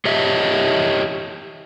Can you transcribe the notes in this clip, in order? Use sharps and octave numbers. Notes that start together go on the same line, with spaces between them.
G4 C#5 D#5 E5